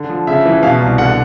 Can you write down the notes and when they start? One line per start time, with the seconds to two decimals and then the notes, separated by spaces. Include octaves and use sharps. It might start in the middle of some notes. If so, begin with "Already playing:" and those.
Already playing: D3
0.09 F3
0.27 C#3 E5
0.45 E3
0.63 B2 F5
0.81 C2
0.98 D3 F#5